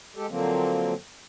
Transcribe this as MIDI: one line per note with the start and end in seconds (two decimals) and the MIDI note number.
0.16 0.26 56
0.16 0.26 67
0.16 0.26 69
0.29 0.94 50
0.29 0.94 53
0.29 0.94 54
0.29 0.94 58
0.29 0.94 60